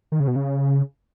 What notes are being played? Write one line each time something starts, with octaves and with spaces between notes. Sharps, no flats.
D#3
C#3
B2
C#3